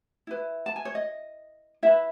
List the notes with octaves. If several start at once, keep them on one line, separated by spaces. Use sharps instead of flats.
E4 B4
A5
G#5
C#5
D#5
E4 B4 E5